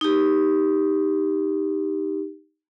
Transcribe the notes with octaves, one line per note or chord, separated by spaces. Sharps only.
D#4 G4